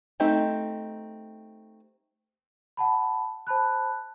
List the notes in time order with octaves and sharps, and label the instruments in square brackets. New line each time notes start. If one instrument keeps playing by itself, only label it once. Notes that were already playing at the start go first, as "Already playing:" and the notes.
[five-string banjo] A3 C4 D#4 G4
[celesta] F#5 A5 B5
C5 A5 B5 F#6